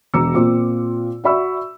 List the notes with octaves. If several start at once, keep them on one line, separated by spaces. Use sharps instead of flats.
E1 F#4 A#5 D6 E6 C#7
A#2 C4 F4 D6
F#4 D5 E5 B5 C#6 E6